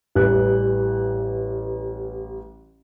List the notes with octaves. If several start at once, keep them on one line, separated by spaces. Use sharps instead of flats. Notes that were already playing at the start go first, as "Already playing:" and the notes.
A1 E3 G3 F#6